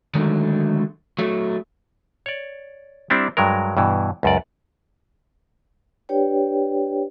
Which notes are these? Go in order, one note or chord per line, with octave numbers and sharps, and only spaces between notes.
D3 D#3 F#3 G#3 A3
F#3 A3
C#5 D5
G3 C4 D4 E4
G2 F#3 G#3 A#4
G2 B2 E3
C#2 F#2 D5
D4 G4 B4 C#5 D5 G5